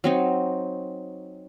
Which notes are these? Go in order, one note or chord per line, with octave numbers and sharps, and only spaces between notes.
F#3 C4 D#4